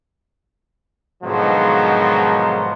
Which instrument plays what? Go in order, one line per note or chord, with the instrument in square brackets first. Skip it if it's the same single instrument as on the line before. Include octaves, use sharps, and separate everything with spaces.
[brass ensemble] G#2 B2 D3 D#3 F3 F#3